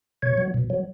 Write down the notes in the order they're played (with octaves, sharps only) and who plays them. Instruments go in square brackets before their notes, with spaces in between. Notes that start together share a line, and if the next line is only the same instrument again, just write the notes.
[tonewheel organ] B2 C#5
F#3
B2
F#3